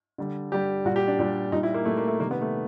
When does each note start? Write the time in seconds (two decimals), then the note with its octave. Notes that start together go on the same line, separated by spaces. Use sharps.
0.18 D3 G3
0.52 D3 G3 G4
0.85 A#2 G3 F#4
0.96 G4
1.08 D4
1.19 A#2 G3 D4
1.52 A#2 G3 D#4
1.63 E4
1.74 A#3
1.85 A#2 G3 A3
1.97 A#3
2.08 A3
2.20 C3 D#3 G3 A#3
2.31 B3
2.42 A3